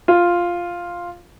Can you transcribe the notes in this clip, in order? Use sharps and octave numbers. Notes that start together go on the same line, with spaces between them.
F4